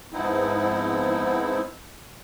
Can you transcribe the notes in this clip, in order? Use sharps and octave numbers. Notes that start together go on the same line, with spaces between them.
G#2 F3 B3 C4 D#4 E4